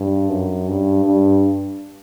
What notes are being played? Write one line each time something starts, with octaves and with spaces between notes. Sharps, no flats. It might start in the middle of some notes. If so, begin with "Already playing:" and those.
Already playing: G2
F#2
G2
G2